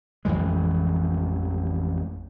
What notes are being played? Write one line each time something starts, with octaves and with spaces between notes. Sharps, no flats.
A1 F2 E3 G#3